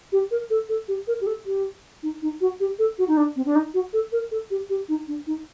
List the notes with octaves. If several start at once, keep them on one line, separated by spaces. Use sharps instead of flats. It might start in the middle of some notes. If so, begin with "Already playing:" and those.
G4
A#4
A4
A4
G4
A#4
G4
A4
G4
D#4
D#4
F#4
G4
A4
F#4
D#4
D4
C4
D4
D#4
F#4
A4
A#4
A4
G4
G4
D#4
D4
D#4